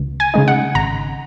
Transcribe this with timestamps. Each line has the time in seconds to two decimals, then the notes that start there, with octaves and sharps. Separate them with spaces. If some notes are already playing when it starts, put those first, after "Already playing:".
Already playing: C#2
0.20 G#5
0.34 C#3 G#3 D#4
0.48 F#5
0.75 G#1 A#5